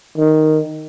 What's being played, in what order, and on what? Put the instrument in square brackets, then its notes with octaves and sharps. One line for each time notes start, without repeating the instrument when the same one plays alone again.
[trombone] D#3